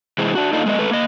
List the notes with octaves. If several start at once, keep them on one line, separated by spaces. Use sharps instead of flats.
C3 E3 G#3 C4
D4 F#4
A#3 D4 D#4 F4 A4 D#5
G#3 A3 B3 D#5
G#3 A3 A4 B4
A#3 D#5